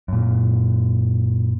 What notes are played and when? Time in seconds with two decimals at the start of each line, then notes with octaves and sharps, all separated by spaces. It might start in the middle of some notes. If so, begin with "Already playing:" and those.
0.08 F#2 A#2